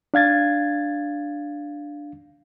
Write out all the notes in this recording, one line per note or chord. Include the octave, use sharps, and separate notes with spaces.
D4 F5 G#6 A6